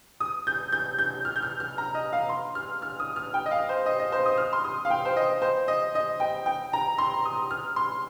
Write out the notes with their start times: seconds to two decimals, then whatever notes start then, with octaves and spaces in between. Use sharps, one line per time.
0.20 D#6
0.47 G6
0.72 G6
0.99 G6
1.25 F6
1.36 G6
1.42 F6
1.60 F6
1.78 A#5
1.95 D#5
2.13 F5
2.29 C6
2.55 F6
2.82 F6
3.00 D#6
3.16 F6
3.34 G5
3.46 D#5
3.51 F5
3.69 C5
3.86 D#5
3.99 D#5
4.12 C5
4.26 D#6
4.37 F6
4.53 C6
4.64 D#6
4.85 F5
4.90 G5
5.05 C5
5.16 D#5
5.42 C5
5.68 D#5
5.95 D#5
6.20 G5
6.46 G5
6.73 A#5
6.98 C6
7.25 D#6
7.51 F6
7.76 C6